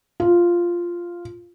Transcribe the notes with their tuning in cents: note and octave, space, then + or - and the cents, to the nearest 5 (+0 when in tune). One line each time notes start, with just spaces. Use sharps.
F4 -5